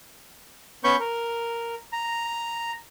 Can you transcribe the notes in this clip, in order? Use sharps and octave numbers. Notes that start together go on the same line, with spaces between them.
B3 C#4 B5 C#6 G6
A#4
A#5